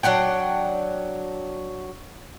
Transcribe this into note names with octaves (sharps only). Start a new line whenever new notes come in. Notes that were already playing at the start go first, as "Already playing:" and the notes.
F#3 D4 F#5 G5